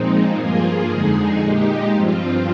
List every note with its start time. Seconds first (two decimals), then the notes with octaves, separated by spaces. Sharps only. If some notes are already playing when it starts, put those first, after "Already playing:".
Already playing: A#2 F3 G#3 C4 D#4
0.35 G2 F3 A#3 F4 G#4
0.88 F2 D3 G#3 D#4 G#4
1.40 A#2 G#3 D#4 G4
1.92 G2 F3 C4 F4